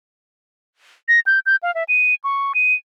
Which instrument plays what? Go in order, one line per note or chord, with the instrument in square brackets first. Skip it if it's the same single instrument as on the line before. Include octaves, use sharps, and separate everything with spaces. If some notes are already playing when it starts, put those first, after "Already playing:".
[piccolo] A#6
G6
G6
F5
E5
D#7
C#6
D#7